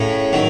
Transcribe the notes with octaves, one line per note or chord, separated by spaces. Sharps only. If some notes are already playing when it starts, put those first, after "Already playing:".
Already playing: A2 C#3
D#3 F#3